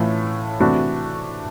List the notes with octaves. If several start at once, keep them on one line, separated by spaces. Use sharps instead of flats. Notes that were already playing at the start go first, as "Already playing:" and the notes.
Already playing: A2 E3 A3 C#4 F4
C3 E3 A3 D4 F#4